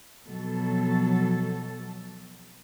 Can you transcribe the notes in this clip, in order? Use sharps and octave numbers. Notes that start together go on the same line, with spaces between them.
B2 F3 F#3 A4